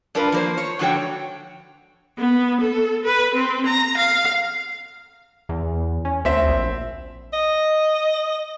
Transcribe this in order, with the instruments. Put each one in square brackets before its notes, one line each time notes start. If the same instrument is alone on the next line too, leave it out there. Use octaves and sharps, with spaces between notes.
[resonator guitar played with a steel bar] G2 D4 F4 A#4 B4
F3 A#3 C5
C#5
G#2 D3 F3 F#4 C#5 G5
[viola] B3
A4
B4
C4
A#5
F5
[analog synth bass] E2
C#4
[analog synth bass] D2 [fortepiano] C4 E5
[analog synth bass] A#1
[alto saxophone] D#5